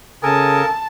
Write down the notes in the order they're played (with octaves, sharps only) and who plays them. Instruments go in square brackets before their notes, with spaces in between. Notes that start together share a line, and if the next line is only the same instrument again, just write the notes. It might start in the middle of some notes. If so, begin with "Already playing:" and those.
[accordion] C#3 D#6 [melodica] A4 A#4 [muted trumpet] G#5 [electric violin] A5